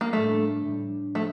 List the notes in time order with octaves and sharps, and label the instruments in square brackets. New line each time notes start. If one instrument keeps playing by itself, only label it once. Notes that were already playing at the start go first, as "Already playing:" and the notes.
[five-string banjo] A#3
[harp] A2 G3 D4 [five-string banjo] A3
[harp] A2 G3 D4
[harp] F3 A#3 [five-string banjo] A3